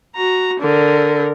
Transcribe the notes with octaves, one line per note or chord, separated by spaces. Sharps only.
F#4 A#5
D3 A#4